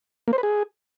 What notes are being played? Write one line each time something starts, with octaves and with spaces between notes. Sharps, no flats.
A#3
C5
B4
G#4